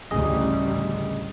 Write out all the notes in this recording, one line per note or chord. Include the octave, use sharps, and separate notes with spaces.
A1 D2 C#3 G3 G#4 D#5